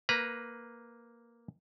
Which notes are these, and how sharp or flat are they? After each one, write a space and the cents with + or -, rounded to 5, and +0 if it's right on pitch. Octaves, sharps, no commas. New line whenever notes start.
A#3 +0 B4 +0 A#5 +20